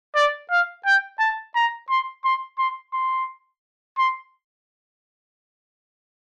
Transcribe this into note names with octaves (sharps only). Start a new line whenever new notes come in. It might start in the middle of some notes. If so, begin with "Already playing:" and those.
D5
F5
G5
A5
A#5
C6
C6
C6
C6
C6